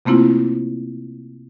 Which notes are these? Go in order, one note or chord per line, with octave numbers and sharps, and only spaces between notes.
C3 A3 A#3 C4 E4 F4